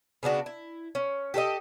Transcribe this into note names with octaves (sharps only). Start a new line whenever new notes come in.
C#3 B3 D4 F#4
E4
C#4
G4 A4 C5 D#5